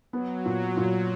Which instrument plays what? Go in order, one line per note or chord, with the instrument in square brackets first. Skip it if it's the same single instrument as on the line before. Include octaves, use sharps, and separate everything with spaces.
[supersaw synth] F#3 [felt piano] B3
[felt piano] A#2
A#2